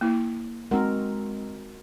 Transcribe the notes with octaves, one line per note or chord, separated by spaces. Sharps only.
A#3 E4
G#3 C4 D#4 F#4 A#4 F#5